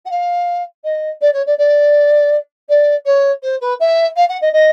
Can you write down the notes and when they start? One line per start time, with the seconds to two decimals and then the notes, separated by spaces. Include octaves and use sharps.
0.05 F#5
0.10 F5
0.84 D#5
1.21 D5
1.33 C#5
1.46 D5
1.58 D5
2.69 D5
3.05 C#5
3.42 C5
3.61 B4
3.80 E5
4.16 F5
4.29 F#5
4.41 D#5
4.53 D#5